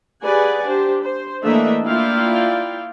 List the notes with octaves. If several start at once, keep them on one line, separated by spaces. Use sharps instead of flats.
G4 G#4 B4 D5 F#5 G#5
D4 G4 C5
C5
E3 A3 A#3 D4 D#5 E5
A#3 E4 F4 D5 F5 G5